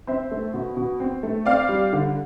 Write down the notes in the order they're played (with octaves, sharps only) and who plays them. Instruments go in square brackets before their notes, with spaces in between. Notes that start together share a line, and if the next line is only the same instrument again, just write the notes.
[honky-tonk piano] C4 C5 E5
A3
B2
B2
C4
A3
C4 D5 F5
G3
D3